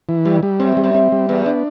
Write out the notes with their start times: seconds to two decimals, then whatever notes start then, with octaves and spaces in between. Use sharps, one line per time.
0.09 E3
0.25 G2 G3
0.43 G3
0.60 F#2 C4
0.72 E2
0.77 G3
0.84 F#2
0.94 C4
1.12 G3
1.29 E2 B3
1.46 D4